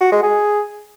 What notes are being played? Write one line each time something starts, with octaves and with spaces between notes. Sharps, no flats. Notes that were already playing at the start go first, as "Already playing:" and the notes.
F#4
G#3
G#4